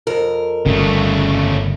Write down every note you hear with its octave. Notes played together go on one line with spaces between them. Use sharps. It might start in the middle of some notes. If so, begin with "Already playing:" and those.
F2 A#4
G1 C#3 G3 A3